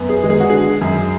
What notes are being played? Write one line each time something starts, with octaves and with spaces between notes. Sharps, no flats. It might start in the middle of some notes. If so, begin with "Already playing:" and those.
Already playing: F#2 B3
G#4
G#3
G#4
F#4
D3 G#4
F#2